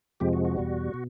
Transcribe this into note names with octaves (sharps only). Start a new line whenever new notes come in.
F2 C3 F3 G#3 G4
F#4
F#4
E2 B2 G3
B2